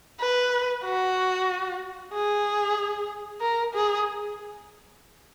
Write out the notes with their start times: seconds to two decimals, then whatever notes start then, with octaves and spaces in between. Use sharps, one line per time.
0.20 B4
0.85 F#4
2.14 G#4
3.41 A#4
3.74 G#4